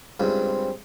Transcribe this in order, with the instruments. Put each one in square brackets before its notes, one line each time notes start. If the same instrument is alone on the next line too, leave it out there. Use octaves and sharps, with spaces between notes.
[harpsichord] C#2 G2 [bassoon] C4